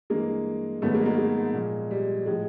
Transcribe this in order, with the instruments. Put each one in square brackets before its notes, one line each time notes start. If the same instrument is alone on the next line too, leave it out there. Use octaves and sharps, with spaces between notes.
[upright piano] G2 E3 G#3 A#3
G#2 D#3 F#3 A3 B3
G#3 A#3
G#3 A#3
G#3
A#2 F3
G3
A2 F3 G#3